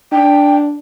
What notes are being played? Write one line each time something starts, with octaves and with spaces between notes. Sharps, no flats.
D4 G5